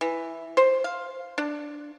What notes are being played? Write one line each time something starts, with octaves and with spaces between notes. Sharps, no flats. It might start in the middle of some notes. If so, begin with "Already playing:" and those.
E3
C5
F5
D4